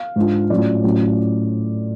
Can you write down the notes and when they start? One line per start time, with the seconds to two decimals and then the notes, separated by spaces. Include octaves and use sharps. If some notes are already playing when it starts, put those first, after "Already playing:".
Already playing: F5
0.16 G#2 G#3 D4 F4
0.50 A2 F#3 C#4 F4 D5
0.84 A2 F#3 C#4 F4